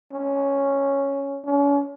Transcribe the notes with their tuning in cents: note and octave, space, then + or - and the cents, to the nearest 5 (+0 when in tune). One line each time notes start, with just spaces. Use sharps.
C#4 +0
C#4 +35